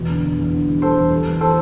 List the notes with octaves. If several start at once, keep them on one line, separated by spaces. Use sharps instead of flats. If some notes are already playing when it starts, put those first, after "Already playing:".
Already playing: E2 B2
D3
E2
E2
D3
G3
G3 A4 C5
E2
G3
E3
E3 A4 C5